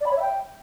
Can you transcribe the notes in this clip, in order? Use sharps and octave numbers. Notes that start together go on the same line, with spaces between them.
D5
B5
C#5
E5
G5